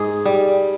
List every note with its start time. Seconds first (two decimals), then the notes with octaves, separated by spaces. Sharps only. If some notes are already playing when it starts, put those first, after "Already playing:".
Already playing: G#2 G#4
0.25 G3